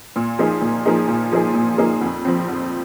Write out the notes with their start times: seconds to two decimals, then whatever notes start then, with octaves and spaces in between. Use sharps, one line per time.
0.16 A#2
0.39 F3 A#3 D#4 G#4
0.62 A#2
0.85 F3 A#3 D#4 G#4
1.08 A#2
1.32 F3 A#3 D#4 G#4
1.54 A#2
1.78 F3 A#3 D#4 G#4
2.01 F2
2.25 F3 C4
2.48 F2